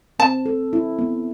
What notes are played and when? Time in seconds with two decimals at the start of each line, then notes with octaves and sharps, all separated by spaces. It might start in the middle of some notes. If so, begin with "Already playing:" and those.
0.19 C4 A5
0.46 A4
0.73 E4
0.99 B3